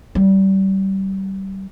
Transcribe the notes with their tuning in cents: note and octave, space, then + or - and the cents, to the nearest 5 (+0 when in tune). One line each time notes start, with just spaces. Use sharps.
G3 -25